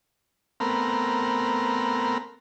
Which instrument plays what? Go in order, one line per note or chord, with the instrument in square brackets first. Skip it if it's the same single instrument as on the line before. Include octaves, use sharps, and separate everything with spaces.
[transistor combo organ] A3 B3 C4 A#4